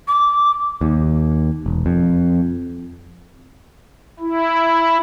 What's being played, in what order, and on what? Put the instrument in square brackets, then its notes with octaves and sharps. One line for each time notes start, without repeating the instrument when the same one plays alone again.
[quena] D6
[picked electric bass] D#2
E1
F2
[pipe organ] E4